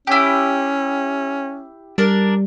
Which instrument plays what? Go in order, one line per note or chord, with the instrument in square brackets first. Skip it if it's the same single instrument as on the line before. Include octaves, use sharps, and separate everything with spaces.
[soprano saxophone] C#4 [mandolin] E4 G4
[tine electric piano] G3 [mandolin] D4 A#4